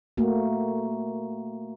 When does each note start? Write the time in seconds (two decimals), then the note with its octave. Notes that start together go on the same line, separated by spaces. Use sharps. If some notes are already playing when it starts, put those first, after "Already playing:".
0.17 A3 A#3 F#4